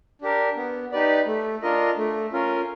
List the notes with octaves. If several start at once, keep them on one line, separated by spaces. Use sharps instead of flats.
D4 G4 A#4
B3
D#4 G4 B4 D5
A3
D4 F4 A#4 D#5
A3
C#4 F4 A#4